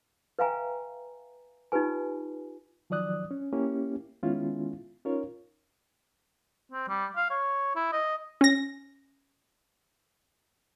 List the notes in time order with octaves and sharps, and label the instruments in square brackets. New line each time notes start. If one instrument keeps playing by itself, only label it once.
[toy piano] B4 E5 F5 G5 G#5 A#5
D#4 F4 G4 B4 G#5
[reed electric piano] D#3 F3 F#3 D5 D#6 F#6
C#4
A#3 C#4 E4 G4
D#3 G#3 B3 C#4 E4 F4
C#4 D#4 F4 A#4 C#5
[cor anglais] C4
G3
F5
C#5
E4
D#5
[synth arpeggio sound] C#4 A#6